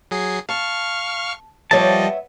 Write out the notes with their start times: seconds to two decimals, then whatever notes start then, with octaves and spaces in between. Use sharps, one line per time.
0.11 F#3 G#4 C7
0.49 F5 A5 C#6 F6
1.71 F3 G3 B3 C#5 D#5 E5 A5